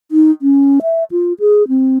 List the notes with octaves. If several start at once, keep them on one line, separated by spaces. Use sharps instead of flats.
D#4
C#4
E5
F4
G#4
C4